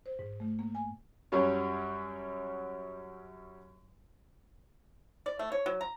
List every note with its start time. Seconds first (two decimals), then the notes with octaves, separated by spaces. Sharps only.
0.06 C5
0.19 G#2
0.40 A3
0.59 A#3
0.75 G#5
1.32 F#2 F#3 G3 C#4 C#5
5.26 D5
5.39 A3
5.52 C#5
5.66 F#3
5.81 A#5